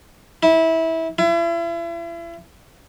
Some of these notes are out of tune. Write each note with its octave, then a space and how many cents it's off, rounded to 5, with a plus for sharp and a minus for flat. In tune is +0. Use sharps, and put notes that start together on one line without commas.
E4 -20
E4 +40